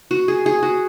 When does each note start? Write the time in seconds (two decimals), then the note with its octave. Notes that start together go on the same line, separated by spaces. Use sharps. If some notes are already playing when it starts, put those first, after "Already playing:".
0.11 F#4
0.28 G#4
0.46 G#4
0.63 F#4